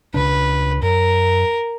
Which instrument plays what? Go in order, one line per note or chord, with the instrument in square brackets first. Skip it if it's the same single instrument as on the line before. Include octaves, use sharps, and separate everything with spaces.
[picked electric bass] C#2 C#3 D4 [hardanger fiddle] B4
[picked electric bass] F#2 [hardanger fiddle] A#4